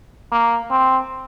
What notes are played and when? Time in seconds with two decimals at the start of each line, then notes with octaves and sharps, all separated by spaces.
0.32 A#3
0.71 C4